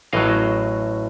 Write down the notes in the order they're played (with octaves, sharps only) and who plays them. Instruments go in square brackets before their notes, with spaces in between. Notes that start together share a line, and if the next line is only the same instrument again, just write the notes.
[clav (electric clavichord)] A1 A2 F#3 D#5 F5